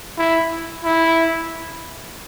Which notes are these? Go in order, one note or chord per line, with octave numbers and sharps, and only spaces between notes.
E4
E4